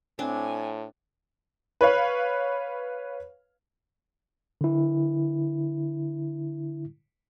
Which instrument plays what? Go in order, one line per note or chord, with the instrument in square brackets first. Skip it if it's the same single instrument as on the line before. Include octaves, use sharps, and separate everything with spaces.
[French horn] A2 [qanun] C4 D4 [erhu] G#5
[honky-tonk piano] B4 C#5 F5
[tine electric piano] D3 E4